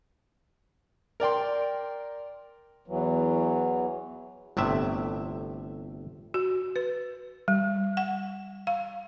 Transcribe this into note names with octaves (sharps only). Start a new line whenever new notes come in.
A#4 D5 G5 C6
E2 E3 F#3
G1 A2 C3 E5
F#4
B4
G3
F#5
F5